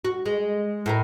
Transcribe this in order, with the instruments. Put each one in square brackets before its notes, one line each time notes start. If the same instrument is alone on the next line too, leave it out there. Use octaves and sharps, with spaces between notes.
[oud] F#4
G#3
A2 E4 A#4